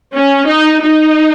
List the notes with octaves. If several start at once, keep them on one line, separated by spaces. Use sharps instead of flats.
C#4
D#4
D#4